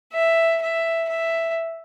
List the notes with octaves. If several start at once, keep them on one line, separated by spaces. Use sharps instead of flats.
E5
E5
E5